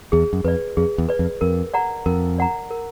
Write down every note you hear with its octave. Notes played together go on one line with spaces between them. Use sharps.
E2 G#4
F#2
F2 B4 D5
F2 G#4
E2
B4 D5
F2
F2 A#4
D5 F#5 A#5
F2 A#4
D5 F#5 A#5
A#4